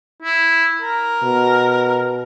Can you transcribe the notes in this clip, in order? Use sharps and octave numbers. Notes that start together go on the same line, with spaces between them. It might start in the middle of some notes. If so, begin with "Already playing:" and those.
E4
A#4
B2